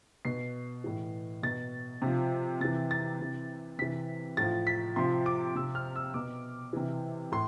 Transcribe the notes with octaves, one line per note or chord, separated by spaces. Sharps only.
B2 C7
A2 E3
B2 A6
C3 F3
C3 E3 A6
A6
C3 E3
C3 E3 B6
A2 F3 A6
B6
C3 F3 C6
D6
C3 F3 E6
F6
E6
B2 D6
C3 E3
A2 C6